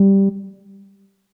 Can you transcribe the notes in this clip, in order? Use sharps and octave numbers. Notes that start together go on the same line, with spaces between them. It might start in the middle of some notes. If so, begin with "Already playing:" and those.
Already playing: G3